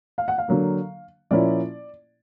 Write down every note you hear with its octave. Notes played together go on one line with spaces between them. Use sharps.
F5
F#5
F5
D3 F#3 A#3
A#2 F3 A#3 C#4 E4 D5